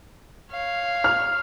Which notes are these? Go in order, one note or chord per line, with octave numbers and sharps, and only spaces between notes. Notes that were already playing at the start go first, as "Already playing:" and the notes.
C#5 F5
F6